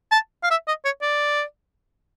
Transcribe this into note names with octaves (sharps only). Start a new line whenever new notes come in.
A5
F5
E5
D#5
C#5
D5